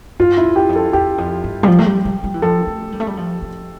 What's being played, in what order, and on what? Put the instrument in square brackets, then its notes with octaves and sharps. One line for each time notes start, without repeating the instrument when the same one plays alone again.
[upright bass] G2 [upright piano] F4
[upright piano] E4
[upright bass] E2
[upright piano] G4
[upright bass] F2
[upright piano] A4
[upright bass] E2 [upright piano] G4
[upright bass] F2
G2
G3
F3
A3
G3
G3
G3
E3
[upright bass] F3 [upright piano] A4
[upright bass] A3
G3
A3
G3
F3
F3